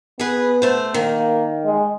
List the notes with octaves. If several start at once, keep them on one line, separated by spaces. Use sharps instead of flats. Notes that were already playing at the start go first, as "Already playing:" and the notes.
B3 G#4 B4
A3 C5
D#3 A#3
G#3